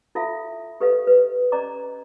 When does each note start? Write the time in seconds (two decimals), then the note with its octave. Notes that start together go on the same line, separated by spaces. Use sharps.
0.15 E4 F4 A4 E5 F5
0.80 G4 A4 B4 D#5 F5
1.07 B4
1.52 C#4 D5 D#5 A#5 D6